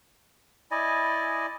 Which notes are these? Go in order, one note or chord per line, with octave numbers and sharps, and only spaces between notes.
E4 D5 D#5 G#5